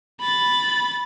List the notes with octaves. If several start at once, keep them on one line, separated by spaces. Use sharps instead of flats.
B5 A6